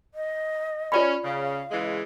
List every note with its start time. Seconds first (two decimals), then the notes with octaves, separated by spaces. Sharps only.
0.14 D#5
0.92 C#4 F4 D5 B5
1.24 C#3 F5
1.71 C#3 E3 G#3